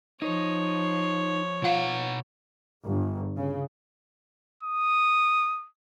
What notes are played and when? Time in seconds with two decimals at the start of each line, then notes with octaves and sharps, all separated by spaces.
0.22 F3 D#4 C#5
1.62 B2 F4 F5 F#5 A#5
2.84 G1
3.36 C#3
4.63 D#6